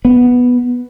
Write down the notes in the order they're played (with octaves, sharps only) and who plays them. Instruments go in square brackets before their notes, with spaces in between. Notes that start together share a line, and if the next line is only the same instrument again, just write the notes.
[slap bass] B3